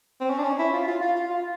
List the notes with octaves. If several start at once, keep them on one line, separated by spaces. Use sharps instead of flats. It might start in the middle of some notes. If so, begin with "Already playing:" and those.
C4
C#4
D4
C#4
E4
F4
F4
F4
F4
F4